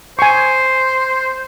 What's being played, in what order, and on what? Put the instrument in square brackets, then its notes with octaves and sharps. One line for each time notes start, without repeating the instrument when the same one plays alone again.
[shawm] C5 [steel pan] G#5 C#6